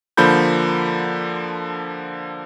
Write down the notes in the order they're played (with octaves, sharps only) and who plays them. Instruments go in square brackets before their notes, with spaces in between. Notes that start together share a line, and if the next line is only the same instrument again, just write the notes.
[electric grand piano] D3 F3 A#3 B5 G6